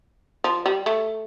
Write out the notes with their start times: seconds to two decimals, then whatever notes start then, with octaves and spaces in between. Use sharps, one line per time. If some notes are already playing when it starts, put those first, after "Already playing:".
0.44 F3
0.66 G3
0.86 A3